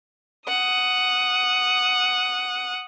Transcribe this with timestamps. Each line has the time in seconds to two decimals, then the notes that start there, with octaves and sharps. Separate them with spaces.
0.48 F#5 D#6